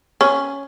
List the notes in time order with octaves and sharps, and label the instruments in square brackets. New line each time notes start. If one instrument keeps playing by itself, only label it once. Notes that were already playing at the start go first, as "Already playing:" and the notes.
[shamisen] C#4